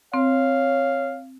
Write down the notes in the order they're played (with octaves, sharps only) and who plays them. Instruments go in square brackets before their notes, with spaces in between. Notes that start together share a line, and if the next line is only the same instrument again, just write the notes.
[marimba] C4 [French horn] C#5 [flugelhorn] F5